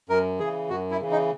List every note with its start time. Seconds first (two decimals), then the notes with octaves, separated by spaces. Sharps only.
0.09 F#2 A#4
0.39 C#3 E3 G#4
0.70 F#2 F#4
0.91 E4
1.01 C#3 E3
1.11 D#4